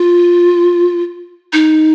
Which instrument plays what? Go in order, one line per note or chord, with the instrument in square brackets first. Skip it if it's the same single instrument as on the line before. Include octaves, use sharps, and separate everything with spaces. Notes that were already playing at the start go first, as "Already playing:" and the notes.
Already playing: [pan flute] F4
D#4